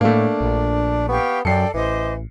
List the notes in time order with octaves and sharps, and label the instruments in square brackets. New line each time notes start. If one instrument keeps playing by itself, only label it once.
[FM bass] A2 [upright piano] A3 A#3 [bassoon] D4
[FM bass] A#1
[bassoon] B3 [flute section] G4 F5 C#6
[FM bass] F#2 [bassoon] A4 [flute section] D5 G5 [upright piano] C7 C#7
[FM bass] A1 [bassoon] E3 [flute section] C5 D#5 D6